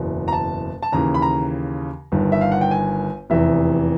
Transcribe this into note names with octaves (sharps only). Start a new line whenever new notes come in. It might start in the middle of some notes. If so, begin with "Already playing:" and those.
Already playing: F#1 E2 B2
A#5
A5
A5
D#2 C#3 E3 A#5
B5
A#5
G1 G2 D#3
E5
F5
F#5
G5
G#5
F1 E2 C3 E3 E5